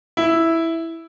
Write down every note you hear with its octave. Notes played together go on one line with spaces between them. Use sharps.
E4